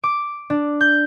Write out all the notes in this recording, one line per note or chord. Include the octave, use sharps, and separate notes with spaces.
D6
D4
G6